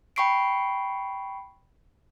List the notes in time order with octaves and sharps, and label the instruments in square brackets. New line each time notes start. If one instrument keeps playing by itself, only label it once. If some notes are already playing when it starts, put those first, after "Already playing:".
[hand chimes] G5 B5 C#6 C7 D7